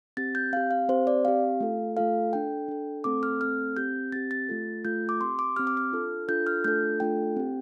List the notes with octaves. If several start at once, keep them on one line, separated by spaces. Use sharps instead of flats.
C4 G4 A6
G6
C4 G4 F5
F5
C4 G4 C5
D5
C4 G4 F5
A3 F4 A4
A3 F4 A4 F5
D4 A4 G5
D4 A4
A3 C4 A4 D6
F6
A3 C4 A4 F6
C4 G4 G6
C4 G4 A6
A6
A3 F4 A4
A3 F4 A4 G6
D6
C4 G4 C6
D6
C4 G4 F6
D6
F6
D4 F4 A4
D4 F4 A4 G6
F6
A3 D4 F4 A4 G6
A3 D4 F4 A4 G5
C4 G4